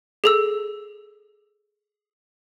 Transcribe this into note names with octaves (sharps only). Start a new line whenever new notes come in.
G#4 A4 E6